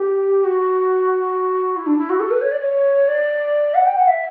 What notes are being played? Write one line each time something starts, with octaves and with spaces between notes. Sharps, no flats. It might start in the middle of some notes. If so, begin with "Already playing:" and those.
Already playing: G4
F#4
E4
D4
E4
F#4
A4
B4
C#5
D5
C#5
D5
F#5
G5
F#5
E5